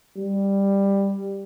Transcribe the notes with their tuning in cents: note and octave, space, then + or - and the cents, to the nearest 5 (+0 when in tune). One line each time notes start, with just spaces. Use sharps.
G3 +10